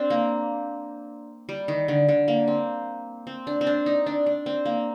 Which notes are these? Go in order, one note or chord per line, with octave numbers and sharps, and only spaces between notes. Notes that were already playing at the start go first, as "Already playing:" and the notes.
Already playing: C4 D4
A#3
G3
D#3
D3
D3
A#3
C4
C4
D4
C4
D4
D#4
D4
D4
C4
A#3